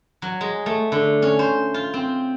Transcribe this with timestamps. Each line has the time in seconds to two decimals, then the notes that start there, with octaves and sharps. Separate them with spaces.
0.22 F#3
0.41 G#3
0.66 A3
0.92 D3
1.22 C#4
1.39 C5
1.74 F4
1.94 C4